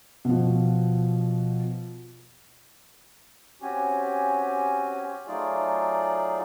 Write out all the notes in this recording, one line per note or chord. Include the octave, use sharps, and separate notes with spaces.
B2 F3
C4 C#4 F#4 G4 G#5
F#3 A3 D#4 F4 G#4 D5